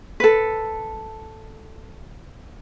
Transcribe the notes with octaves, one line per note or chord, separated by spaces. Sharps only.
A4 B4